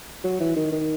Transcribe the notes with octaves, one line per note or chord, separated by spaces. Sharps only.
F#3
E3
D#3
D#3